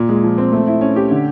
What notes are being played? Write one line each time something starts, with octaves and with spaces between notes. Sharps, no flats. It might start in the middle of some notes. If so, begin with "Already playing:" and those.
Already playing: A#2
G#3
F3
C4
A3
E4
C#4
G4
D3